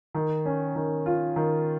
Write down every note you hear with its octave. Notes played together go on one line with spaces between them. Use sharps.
D#3
C#4
D#3
F4
D#3